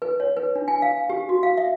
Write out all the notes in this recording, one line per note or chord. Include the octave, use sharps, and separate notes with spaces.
B4
C#5
B4
D4
G#5
F5
G4
F#4
F5
E5